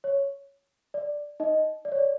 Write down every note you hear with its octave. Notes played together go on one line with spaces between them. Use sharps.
C#5
D5
D#4 D#5
D5
C#5
D5